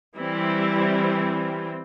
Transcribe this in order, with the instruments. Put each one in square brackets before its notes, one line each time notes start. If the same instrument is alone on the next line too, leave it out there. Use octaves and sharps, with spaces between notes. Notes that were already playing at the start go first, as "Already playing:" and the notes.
[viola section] E3 G3 C4 E4